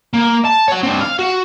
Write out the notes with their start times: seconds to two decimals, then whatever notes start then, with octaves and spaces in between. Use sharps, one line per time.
0.14 A#3
0.45 A5
0.68 C#5 F#5
0.83 C4 D4
1.01 F5
1.19 F#4